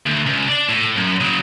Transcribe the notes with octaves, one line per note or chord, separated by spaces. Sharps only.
D2
C#2
D4 D5
A2
F#2
C#3 F#3